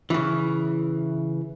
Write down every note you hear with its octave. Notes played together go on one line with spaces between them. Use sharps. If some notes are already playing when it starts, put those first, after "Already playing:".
C#3 E3